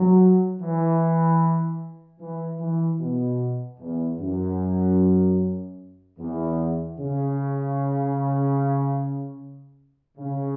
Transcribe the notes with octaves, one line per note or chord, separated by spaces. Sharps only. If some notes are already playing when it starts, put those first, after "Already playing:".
Already playing: F#3
E3
E3
E3
B2
E2
F#2
E2
C#3
C#3